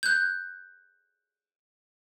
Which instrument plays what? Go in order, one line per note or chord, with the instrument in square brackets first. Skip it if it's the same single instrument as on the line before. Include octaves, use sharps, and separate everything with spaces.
[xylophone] F#6 G6